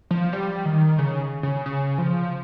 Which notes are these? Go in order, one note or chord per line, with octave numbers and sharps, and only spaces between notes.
F3
G3
D#3
C#3
C#3
C#3
F3